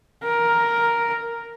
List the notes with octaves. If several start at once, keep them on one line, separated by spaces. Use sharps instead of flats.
A#4